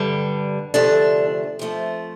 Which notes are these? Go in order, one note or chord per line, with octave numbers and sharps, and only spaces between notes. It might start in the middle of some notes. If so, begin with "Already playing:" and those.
Already playing: G2 D3 G3
D2 C3 F3 A3 D4
F2 F3 A3